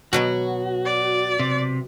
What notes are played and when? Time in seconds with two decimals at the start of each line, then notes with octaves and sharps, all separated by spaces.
0.13 B2 F#3 B3 F#4
0.86 D5
1.39 C3